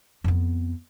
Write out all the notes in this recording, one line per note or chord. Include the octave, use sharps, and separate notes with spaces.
F2 B3